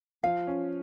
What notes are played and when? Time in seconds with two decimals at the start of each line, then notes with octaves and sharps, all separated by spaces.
0.23 F3 F4 F5
0.47 C#4